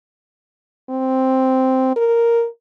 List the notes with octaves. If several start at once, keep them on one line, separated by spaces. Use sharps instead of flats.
C4
A#4